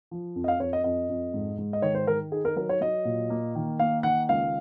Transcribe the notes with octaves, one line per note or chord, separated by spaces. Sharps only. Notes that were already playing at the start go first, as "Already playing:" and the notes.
F3
F2
D#5
F5
F2 C#5
D#5
F2 D#5
F2
G#2
G#2
D#5
D#3 C#5
C5
D#3 A#4
D#4 G#4
A#4
F#3 A#4
C#5
F#3 D#5
A#2
A#3
D#3
A#3 F5
D#3 F#5
C#2 F5